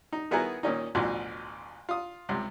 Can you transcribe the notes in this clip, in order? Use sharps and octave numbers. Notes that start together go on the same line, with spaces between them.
D#4
D#3 B3 E4 F#4 G#4 A#4
A#2 D#3 C#4 D#4
A1 D2 B2 F3
F4 D#6
C#2 C3